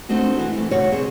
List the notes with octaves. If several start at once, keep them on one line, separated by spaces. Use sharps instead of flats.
A3 C4 D4 D#4 F#4
E3 E4 F#4
E3 A3
D#2 C#3 F#4 C#5 D5
B2 C4 G#4